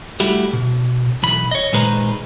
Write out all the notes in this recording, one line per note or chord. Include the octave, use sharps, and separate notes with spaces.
G3 A3 E4 F#4 G4
B2
B1 E3 B5
C#5 D#5
A#2 D#3 G#3 B4 C5 A#5